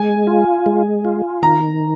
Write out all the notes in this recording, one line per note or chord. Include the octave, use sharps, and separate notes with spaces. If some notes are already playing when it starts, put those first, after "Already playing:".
Already playing: G#3 G#5
F4
G#3
F4
D#3 A#5